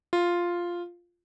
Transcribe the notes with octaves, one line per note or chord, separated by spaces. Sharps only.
F4